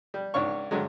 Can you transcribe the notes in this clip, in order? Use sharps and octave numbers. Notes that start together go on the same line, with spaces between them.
G3
C#2 G#2 D4 C#5 F5 C#6
G2 D3 F#3 G#3